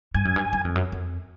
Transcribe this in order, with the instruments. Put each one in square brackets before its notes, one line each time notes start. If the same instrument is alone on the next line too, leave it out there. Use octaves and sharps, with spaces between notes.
[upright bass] G2 [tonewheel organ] G#5
[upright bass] F#2
G2
F#2
F2
F#2
F2